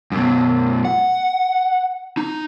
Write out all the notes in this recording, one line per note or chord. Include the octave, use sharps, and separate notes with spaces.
F#2 B2
F#5
D#4